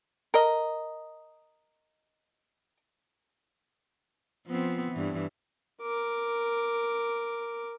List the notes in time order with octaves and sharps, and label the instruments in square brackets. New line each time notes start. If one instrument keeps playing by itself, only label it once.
[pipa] A#4 D#5
[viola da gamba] F3 B3 C4
G2 E3
[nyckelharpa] A#4 D6